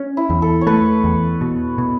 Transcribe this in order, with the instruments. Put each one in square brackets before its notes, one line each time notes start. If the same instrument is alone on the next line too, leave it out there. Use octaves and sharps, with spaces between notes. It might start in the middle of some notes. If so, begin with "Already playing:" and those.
Already playing: [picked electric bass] C#4
[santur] E4
[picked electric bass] E2
[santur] A4
C#5
[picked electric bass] A3 [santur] B4
[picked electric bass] E2
B2
B2